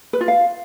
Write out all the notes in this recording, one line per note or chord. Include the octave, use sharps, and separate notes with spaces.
B4
F4
F5